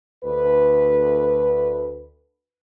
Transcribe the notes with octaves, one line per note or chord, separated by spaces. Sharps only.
D2 B4